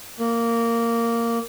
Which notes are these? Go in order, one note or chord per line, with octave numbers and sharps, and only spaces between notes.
A#3